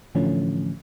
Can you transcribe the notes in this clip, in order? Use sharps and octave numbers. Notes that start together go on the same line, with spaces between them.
A2 D3 E3 F3 A3 C#4